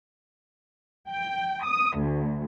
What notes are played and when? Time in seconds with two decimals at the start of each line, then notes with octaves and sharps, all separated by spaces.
1.08 G5
1.64 D#6
1.97 D2